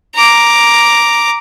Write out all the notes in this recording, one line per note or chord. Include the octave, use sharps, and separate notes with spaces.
A#5 D6